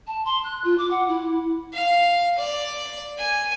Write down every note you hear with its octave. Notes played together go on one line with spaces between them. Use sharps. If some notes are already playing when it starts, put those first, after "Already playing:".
A5
C6
F#6
F4
D6
F#5
E4
F5
D5
G#5